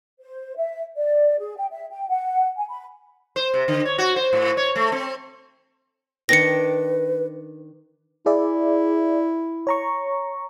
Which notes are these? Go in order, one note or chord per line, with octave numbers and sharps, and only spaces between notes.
C5
E5
D5
G#4
G5
E5
G5
F#5
G#5
B5
C5
C3
D3
C#5
F#4
C5
A2
C#5
A3
C4
D#3 D4 B4 G5 A#6 C#7
E4 G#4 D5 E5
C#5 A#5 C#6